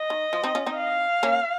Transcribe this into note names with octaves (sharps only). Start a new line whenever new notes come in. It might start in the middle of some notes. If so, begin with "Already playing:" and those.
Already playing: D#5
D#3
F3
C4 D#4
C#4 F4
C4 D#4
F5
A#3 C#4